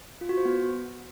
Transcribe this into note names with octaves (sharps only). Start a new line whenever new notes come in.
F4
F#4
C5
B3